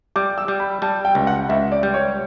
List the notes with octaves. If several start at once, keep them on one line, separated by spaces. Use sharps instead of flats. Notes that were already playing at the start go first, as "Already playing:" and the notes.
G3 D6
E6
G3
B5
G3 A5
G5
C#2
F#5
C#2 E5
D5
G3
C#5